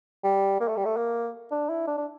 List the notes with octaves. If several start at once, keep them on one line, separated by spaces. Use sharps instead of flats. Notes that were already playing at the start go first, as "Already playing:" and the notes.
G3
A#3
A3
G3
A3
A#3
D4
E4
D4
D4